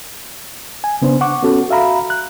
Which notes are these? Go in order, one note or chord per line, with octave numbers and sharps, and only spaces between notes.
G#5
C#3 B3 D4 C5
F#5 C#6 D6
B3 C#4 F#4 A4
F#4 E5 F5 A#5 B5
F#6